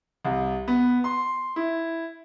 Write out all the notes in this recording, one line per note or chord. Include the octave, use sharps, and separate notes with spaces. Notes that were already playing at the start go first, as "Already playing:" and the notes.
C2
B3
C6
E4